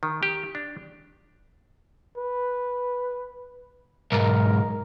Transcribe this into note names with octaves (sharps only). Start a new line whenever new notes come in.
D#3
G4
D4
B4
B1 G#2 A#4